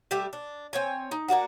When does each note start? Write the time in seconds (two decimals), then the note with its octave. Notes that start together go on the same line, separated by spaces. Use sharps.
0.11 G3 A3 G4 E5
0.33 D4
0.73 C4 C#5 G#5
1.11 D#4
1.28 A#3 D4 F#4 F#5